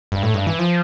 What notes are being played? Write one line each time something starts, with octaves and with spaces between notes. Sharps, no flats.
G2
A2
G2
E3
F3